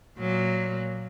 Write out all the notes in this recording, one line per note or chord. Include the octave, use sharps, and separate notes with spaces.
A#2 F#3 A#3